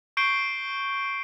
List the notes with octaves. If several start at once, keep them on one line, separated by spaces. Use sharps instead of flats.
C#6 G6 C7 D7 G7